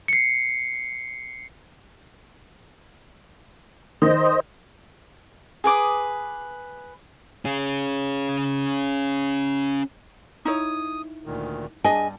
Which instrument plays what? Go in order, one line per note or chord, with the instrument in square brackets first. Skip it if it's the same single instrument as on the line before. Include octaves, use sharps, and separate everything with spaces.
[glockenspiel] C7 C#7
[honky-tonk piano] D#3 [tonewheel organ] C5 D#5
[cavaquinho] G#4 B4 D6 D#6
[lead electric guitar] C#4 G#4
[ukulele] D#4 E4 C#5 [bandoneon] D#6
[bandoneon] D2 A#2 D#3
[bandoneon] G2 G3 [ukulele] D4 G#4 D#5 [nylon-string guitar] G#5